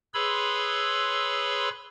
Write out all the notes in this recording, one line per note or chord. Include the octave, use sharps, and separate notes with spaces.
G#4 B4 C#5 B5 C6 E6